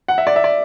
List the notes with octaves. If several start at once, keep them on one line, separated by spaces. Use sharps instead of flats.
F#5
E5
D5
E5
D5